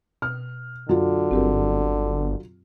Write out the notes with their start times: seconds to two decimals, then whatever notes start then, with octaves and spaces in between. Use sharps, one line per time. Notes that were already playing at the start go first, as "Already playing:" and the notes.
0.22 B2 F6
0.89 F#2 D3 F#3 F4
1.31 G1 C4 G4 A#4